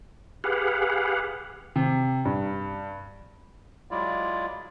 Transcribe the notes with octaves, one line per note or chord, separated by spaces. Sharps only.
G4 G#4 B4 F5 F#5
C3
G2
F#3 G#3 E4 F4 D5